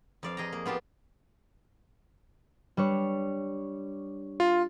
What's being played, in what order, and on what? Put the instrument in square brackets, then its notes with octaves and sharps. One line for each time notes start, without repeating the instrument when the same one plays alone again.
[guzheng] F2 D5 F5
G#4 D#5 G5 A#5
A#3
B3 F4 G4 A5
[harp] G3 D4 C#5
[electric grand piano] F4